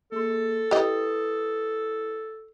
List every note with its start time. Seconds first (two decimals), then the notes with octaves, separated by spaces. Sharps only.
0.12 A#3 G#4 A4 C6
0.71 E4 G4 B4 D#5 D#6